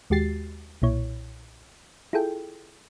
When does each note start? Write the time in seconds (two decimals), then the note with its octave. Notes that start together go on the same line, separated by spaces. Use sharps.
0.10 D#2 G#3 F#4 G4 A6 C7
0.82 B1 A#2 E4 C#5
2.13 E4 F4 G#4 A4 G5